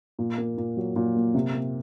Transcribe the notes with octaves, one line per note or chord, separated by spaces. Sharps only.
A#2
A#3
A#2
F#3
A#2
A#3
C3
A#3